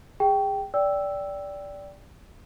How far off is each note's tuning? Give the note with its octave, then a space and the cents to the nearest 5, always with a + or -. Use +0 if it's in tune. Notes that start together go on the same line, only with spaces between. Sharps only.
G#4 -25 G5 -10
D5 -15 G5 +0 E6 +0